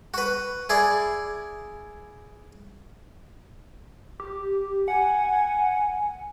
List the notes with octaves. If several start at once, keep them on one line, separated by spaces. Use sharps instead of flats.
F#4 B4
E4 G#4 D5
G4
F#5 G#5